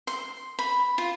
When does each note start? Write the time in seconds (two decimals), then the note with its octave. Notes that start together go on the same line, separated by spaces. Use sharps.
0.07 C6
0.59 B5
0.98 F4